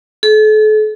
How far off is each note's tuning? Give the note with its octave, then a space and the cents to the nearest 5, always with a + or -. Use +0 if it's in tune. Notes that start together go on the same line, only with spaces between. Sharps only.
A4 -40